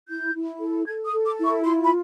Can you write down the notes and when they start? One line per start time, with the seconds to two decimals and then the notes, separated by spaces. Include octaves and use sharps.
0.08 E4 G6
0.34 E4
0.60 A4
0.85 A4 G#6
1.05 D#6
1.12 A4
1.24 D6
1.37 E4
1.44 C#6
1.64 F4 C6
1.83 B5